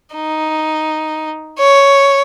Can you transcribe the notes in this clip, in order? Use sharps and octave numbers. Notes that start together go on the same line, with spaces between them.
D#4
C#5